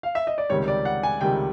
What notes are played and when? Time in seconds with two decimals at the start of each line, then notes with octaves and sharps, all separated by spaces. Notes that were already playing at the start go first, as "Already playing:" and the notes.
0.03 F5
0.15 E5
0.27 D#5
0.38 D5
0.50 C#2 C3 D#3 G3 C#5
0.68 D5
0.85 F#5
1.03 G#5
1.21 C#2 C3 D#3 G3 G5